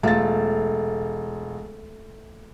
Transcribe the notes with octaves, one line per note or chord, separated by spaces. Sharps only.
E1 A3 F4 A6